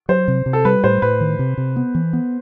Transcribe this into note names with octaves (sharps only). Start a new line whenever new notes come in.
F#3 C5
C3
C3
A4
G3 B4
A2 C5
A2 B4
D#3
C3
C3
B3
E3
B3